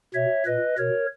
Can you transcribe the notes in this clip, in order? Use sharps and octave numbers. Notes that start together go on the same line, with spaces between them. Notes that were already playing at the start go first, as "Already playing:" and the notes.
B2 C#5 E5
A#2 B4 D#5
B2 A#4 C#5